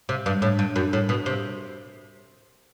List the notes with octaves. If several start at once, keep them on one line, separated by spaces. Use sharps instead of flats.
C3
G2
A2
G2
F#2
A2
B2
C3